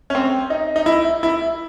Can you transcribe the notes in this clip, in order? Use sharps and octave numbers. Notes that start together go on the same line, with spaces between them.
C#4
C4
D#4
D#4
E4
E4